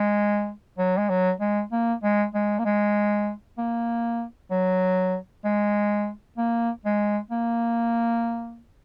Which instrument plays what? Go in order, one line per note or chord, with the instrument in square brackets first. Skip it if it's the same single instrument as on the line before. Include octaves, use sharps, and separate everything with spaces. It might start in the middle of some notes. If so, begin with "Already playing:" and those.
Already playing: [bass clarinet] G#3
F#3
G#3
F#3
G#3
A#3
G#3
G#3
A#3
G#3
A#3
F#3
G#3
A#3
G#3
A#3